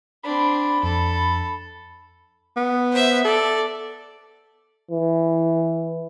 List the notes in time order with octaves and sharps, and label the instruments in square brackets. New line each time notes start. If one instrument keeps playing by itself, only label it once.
[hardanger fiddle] C4 D4 [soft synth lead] B5
[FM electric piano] F2 [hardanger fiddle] A4
[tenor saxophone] B3
[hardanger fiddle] C5 E5
[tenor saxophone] A4 [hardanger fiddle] D5
[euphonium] E3